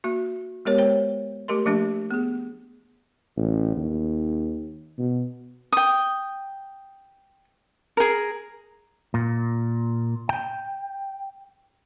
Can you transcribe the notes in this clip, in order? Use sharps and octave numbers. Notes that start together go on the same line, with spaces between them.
A#3 F#4
G#3 B3 G4 A#4 C#5
C5 C#5 G5
A3 G4 A#4 C6
F3 A3 A#3 D4 G4
B3 G#4
A1
D#2
B2
G5 D#6
G#4 A#4
A#2
G5